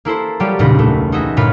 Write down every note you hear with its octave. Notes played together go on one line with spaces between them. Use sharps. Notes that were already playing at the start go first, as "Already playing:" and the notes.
A#3 E4 A4 C5
F#3 G3 F4 G4 C#5 D5
E1 C#2 A#2 D#4 B4 D#5
A3
D#4 F#4 G#4 D#5 E5
G1 A#2 F4 C#5 F5 B5